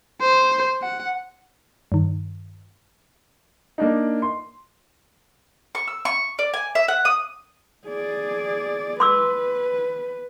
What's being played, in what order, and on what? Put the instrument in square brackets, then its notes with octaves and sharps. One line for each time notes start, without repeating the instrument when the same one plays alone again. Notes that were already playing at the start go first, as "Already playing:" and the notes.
[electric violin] C5
F#5
[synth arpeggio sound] G2 D#3
[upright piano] A#3 D4 D#4
C6
[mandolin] C#6
E6
C#6
D5
G#5
E5
F#5
D#6
[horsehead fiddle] G#4 D5
[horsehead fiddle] B4 [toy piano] C6 D6 E6